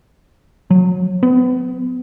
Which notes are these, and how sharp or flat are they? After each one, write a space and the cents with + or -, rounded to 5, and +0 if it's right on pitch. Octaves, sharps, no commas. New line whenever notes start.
F#3 -25
B3 +30